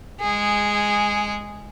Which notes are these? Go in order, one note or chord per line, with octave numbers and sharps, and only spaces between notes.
G#3 G#4